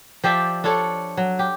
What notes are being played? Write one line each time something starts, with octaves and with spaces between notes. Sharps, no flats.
F3 G4 D5 E5
D4 F4 A4 C#5
F#3
G4